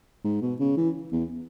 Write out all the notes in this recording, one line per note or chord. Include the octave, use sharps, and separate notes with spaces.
G#2
B2
C#3
E3
E2